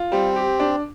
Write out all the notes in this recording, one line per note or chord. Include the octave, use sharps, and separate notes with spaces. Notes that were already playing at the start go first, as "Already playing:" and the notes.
Already playing: F4
G3 C4
G4
D4